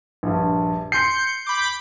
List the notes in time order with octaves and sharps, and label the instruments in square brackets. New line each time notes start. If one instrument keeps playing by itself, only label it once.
[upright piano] A#1 G2
[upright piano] C6 C7 [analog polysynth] G6 C#7
[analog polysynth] B5 D6 G6